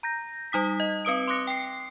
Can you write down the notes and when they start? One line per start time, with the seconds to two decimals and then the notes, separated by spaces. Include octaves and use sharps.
0.03 A#5 G6 A#6
0.52 G3 D#4 D#6 B6
0.80 D#5
1.05 C4 B4 D#6 D7
1.27 C6 D6 D#6 F#6 A#6 C#7
1.47 G5 C7